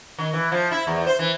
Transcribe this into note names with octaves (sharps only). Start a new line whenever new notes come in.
D#3
E3
F3
E4
E2
C5
E3